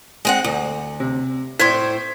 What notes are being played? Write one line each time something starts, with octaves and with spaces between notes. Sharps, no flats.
G#3 C4 F#5
D2
C3
A2 C5 C6 G#6 B6